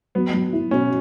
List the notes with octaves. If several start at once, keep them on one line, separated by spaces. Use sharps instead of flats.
F#3 B3
F#3
E4
B2 C#4